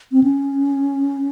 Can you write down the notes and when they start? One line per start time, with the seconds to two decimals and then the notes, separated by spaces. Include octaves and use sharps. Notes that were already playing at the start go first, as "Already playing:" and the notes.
0.12 C4
0.23 C#4